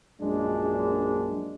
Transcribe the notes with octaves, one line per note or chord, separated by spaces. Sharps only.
A#1 F#2 G#3 D4